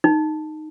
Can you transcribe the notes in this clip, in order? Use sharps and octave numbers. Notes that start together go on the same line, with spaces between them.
D#4